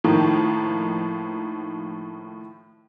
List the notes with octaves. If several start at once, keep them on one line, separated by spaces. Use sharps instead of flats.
A2 D#3 F3 A#3